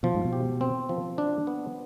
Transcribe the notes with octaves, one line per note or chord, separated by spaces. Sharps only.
B2 F3
G#2
B2
G4
C4
F3
D4
B3